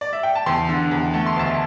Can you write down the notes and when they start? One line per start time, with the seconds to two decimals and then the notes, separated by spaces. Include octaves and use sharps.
0.01 D5
0.13 E5
0.23 G5
0.35 A5
0.46 E2 G5 C6
0.69 D3
0.91 E2
1.14 A3 A5
1.26 C6
1.36 D2 E5 A5